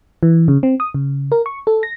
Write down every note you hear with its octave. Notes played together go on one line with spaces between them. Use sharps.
E3
C#3
C4
D#6
C#3
A#4
C#6
A4
A#6